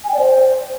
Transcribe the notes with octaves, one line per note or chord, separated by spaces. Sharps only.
G#5
G5
D5
C5